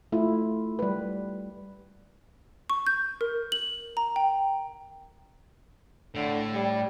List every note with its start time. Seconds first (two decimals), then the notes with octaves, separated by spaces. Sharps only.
0.12 A3 E4 F4
0.79 G3 B4
2.70 C#6
2.87 G6
3.21 A#4
3.52 F#7
3.97 A#5
4.16 G5
6.15 A2 D3
6.54 G3